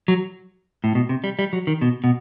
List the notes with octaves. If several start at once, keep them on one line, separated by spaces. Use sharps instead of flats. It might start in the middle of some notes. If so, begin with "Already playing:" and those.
F#3
A2
B2
C3
G3
G3
F#3
D#3
B2
B2